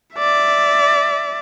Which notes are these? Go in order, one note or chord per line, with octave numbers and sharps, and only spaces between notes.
D5 E5